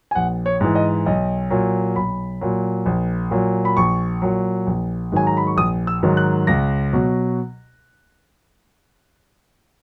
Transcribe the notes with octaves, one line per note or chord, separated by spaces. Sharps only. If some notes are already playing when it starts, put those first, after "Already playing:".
G#5
A#1 F#5
C#5
G#2 E3
D#5
B1 D#5
A#2 F#3
B1 B5
A#2 F#3
A#1
A#2 F#3
B5
A#1 C#6
A#2 F#3
A#1
G#2 D#3 F#3 G#5
A#5
B5
C#6
A#1 D#6
E6
G#2 D#3 F#3
F#6
C#2 A#6
B2 F#3